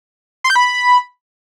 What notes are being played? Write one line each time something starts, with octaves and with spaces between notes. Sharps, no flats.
C6
G6
B5